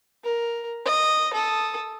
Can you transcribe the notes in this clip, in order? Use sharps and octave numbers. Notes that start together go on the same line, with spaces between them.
A#4
D#5
A4 D#6